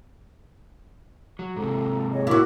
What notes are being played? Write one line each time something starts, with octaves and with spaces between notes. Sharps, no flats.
F#3
G#2 C3 A4 A#5
G#4 C#5 D#5
E4 F#4 A#4 D6